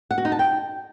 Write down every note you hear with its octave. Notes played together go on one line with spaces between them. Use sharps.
F#5
F#4
D#4
A5
G5